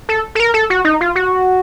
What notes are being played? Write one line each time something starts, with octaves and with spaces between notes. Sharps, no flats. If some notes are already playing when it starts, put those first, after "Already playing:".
A4
A4
A#4
A4
F#4
D#4
F4
F#4